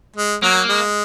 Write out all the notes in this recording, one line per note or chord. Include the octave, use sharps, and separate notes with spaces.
G#3
F#3 A#3
G#3